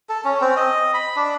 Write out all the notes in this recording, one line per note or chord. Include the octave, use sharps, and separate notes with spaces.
A4
C#4
C4
D#5
B5
D4